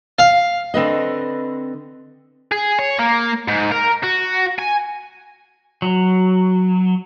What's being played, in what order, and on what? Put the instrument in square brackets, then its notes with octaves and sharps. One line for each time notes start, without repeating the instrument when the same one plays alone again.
[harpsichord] F5
[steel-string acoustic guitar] D3 C4 B4 D#5
[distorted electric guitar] G#4
C#5
A#3
G#2
A#4
F#4
G#5
[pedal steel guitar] F#3